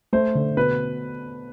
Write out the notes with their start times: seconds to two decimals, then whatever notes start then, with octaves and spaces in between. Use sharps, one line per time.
0.13 A3 C5
0.35 D3
0.57 B2 B4